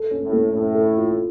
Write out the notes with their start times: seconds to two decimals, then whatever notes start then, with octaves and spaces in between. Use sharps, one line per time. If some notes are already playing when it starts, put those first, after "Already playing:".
Already playing: A4
0.11 C#4
0.22 A2
0.32 A3
0.54 A2 C#4
0.75 A4
0.97 F4